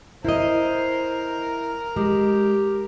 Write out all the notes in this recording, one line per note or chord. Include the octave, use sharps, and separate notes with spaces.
E4 A#4 C5 D#5
G#3 G4